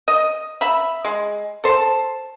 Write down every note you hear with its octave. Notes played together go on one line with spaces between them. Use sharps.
D#5
E5 B5
G#3
A4 C5 A5